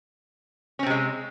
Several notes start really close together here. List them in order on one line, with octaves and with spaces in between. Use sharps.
C#4 C4 C3 G#3